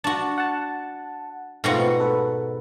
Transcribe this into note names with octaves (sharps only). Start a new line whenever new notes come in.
D4 F#4 A5 C#6
F#5 A5
G#2 B2 A3 C4 F4 F#4
A4 B4